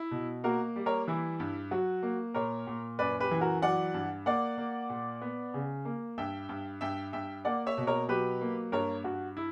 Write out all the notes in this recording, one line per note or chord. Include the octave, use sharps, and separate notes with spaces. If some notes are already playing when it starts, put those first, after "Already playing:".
Already playing: E4
B2
A#3 F#4 A#4
G3
A#4 C#5
E3 E4
G2
F#3 F#4
A#3
A#2 A#4 C#5
A#2
F#2 B4 D5
G4 B4
E3
F#4 A#4
F#3 D5 F#5
G2
A#3 D5 F#5
A#3
A#2
B3
C#3
A#3
G2 E5 G5
G2
G2 E5 G5
G2 E5 G5
A#3 D5 F#5
C#5 E5
B2
A#4 C#5
F#3 G4 B4
A#3
G2 A#4 C#5
G2 F#4
E4